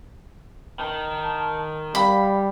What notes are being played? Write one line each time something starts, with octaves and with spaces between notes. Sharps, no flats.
D#3 A5
G3 F5 B5